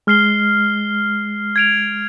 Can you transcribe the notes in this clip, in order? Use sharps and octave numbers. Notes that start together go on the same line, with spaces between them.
G#3 F6 C7 G7
G#6 D7 F7